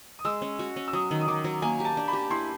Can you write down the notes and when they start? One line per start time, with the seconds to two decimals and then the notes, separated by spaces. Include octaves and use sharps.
0.19 D#6
0.25 G#3 E6
0.42 C#4
0.59 F#4
0.76 C#4
0.88 E6
0.93 F#3 D#6
1.11 D#3
1.21 D#6
1.28 D#3 D6
1.44 F#3
1.62 A#3 G#5
1.80 G4
1.85 A5
1.97 D4
2.08 B5
2.13 G4
2.30 E4 C6